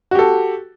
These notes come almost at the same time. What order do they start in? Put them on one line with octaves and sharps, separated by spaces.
F#4 G4 A4